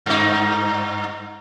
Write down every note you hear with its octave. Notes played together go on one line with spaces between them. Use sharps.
G2 D#4